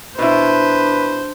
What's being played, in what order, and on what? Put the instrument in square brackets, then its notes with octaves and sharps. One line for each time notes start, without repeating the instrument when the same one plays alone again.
[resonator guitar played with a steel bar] B2 E4 [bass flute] D4 [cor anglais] B4 [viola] C5